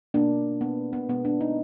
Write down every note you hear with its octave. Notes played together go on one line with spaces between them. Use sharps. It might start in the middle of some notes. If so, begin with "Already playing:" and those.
B2 A#3 D4
B3
B3
B2 G#3 B3
D4
D#4